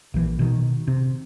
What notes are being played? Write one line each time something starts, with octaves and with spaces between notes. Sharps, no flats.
A#1 E3
B2 D#3
C3